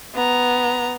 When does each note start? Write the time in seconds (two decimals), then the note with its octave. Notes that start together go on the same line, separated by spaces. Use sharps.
0.14 B3 A#5